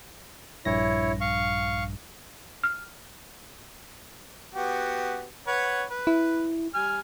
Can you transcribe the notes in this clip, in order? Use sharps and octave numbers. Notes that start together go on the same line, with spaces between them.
A#1 G2 E4 C#5 A#6
F5 C#6
F6
B3 F#4 G4
B4 C#5 F#5
B4
E4
G3 G#5 F6